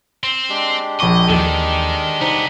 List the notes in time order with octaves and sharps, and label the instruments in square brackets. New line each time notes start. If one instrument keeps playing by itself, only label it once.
[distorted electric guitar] C4
[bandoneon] G#3 D4 G4
[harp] A#1 D6 [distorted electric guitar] D#5 [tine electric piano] B5 C#6
[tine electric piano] D#2 E3 [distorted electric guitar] D#3 [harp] A4
[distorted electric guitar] C2 B3 [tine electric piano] D#4 C5 A#5